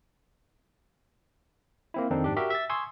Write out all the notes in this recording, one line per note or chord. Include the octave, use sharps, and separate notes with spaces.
A#3 C4 E4
F2 D#3 C4 D4 D#4
G#2 D4 G4
F#4 G4 A#4 E5
E5 E6 A6
G#5 C6 C#6 D#6 E6 G#6